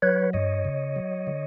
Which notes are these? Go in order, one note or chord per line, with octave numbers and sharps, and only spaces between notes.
F#3 B4 C#5
G2 C#5 D#5
C#3
F#3
D3